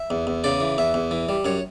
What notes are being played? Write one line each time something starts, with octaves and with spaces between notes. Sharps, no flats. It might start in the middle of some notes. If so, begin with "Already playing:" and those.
Already playing: E5
E2
E2
C#3 D5
E3
E2 E5
E2
E3
G3
F#2 C#5